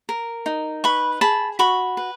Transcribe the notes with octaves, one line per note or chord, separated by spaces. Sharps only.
A#4
D#4
B4 B5 C#6
G#4 A5 B5
F#4 B5 C#6
B4